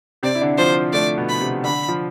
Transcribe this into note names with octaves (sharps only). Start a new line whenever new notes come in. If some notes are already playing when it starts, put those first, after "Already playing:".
C3 C4 D5
E4
D3 D4
F3 F4 C5
A3 D5
B2 B3
B5
C3 C4
D3 D4 B5
F3 F4